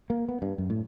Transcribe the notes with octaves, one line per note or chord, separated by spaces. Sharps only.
A#3
B3
G2
F#2
A2